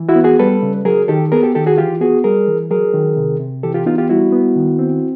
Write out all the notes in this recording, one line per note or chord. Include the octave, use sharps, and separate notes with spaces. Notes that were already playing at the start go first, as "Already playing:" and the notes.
Already playing: E3
E4 F#4
B3
F#4 G#4
G3 A4 B4
C#3
F#3 G#4 A#4
D#3 G4 A4
B3 G#4 A#4
G4 A4
D#3 G4 A4
F#4 G#4
E3 F4 G4
B3 F#4 G#4
G3 G#4 A#4
E3
F#3 G#4 A#4
D#3
C3
C3
E3 G4 A4
F4 G4
B3 D#4 F4
F4 G4
G3 E4 F#4
B3
D#3
C4